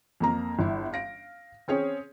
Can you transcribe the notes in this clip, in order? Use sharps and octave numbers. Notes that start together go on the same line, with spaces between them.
F2 A#3 A#5
G1 E4
F5 A#6 D7
C4 C#4 G#4 C#5